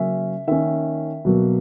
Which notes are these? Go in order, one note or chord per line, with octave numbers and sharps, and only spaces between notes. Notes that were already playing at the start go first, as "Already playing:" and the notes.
Already playing: C#3 F#3 A#3 C#4 E5
D#3 A#3 C#4 E5
B2 F#3 A#3